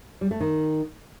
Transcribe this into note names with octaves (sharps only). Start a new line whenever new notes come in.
G3
A3
D#3